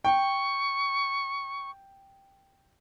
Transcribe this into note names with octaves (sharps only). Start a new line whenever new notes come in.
G5 C#6